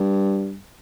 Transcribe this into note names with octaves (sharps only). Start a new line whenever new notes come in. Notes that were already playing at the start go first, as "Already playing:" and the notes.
Already playing: G2